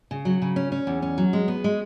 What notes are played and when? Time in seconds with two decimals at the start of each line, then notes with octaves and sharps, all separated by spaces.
0.11 C#3
0.25 F#3
0.42 C#3
0.56 C#4
0.72 C#4
0.87 E2
1.02 C#4
1.18 F#3
1.33 G#3
1.48 B3
1.64 G#3